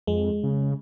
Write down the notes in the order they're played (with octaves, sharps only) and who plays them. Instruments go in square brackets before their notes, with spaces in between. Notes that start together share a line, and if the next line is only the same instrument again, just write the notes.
[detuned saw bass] F2 [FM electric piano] G#3
[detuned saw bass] C#3